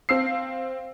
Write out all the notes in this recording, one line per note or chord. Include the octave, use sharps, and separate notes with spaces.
C4 F5 E6 C7